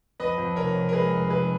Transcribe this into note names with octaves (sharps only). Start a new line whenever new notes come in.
F2 B4 D#5
F2
F1 A#4 C#5
F1
A#4
G#3 G#4 B4
F1
F1 G#4 B4